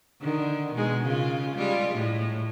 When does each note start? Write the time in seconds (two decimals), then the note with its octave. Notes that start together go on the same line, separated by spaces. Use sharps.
0.21 D3 D#3
0.74 B2 D#3 G#3
1.04 C#3 F4
1.56 G3 G#3 F4
1.94 A2